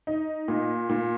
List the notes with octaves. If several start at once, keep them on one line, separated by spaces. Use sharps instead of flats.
D#4
A#2
A#2